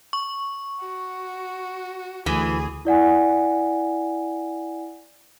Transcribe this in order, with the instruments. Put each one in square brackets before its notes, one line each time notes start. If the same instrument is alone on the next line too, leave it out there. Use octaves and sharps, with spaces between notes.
[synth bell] C#6
[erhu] F#4
[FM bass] D2 [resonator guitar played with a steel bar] E3 [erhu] G#4
[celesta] E4 D5 F#5 G#5